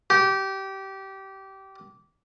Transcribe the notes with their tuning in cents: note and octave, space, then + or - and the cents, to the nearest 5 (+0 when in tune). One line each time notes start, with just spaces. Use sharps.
G4 -20